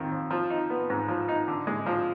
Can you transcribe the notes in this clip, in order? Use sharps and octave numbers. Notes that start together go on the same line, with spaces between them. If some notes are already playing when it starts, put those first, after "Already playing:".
Already playing: F2 D#3
F2
F3
D#4
B3
G#2
F3
D#4
D3
G#3
F3